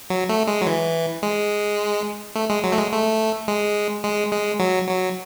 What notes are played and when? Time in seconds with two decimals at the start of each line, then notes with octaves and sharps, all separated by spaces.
0.10 F#3
0.29 A3
0.47 G#3
0.62 F#3
0.66 E3
1.23 G#3
2.35 A3
2.50 G#3
2.64 F#3
2.72 A3
2.77 G#3
2.92 A3
3.48 G#3
4.04 G#3
4.33 G#3
4.60 F#3
4.89 F#3